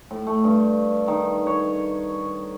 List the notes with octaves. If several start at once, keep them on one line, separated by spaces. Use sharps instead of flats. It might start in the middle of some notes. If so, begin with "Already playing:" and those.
A2
A3
G2
D#3
C#5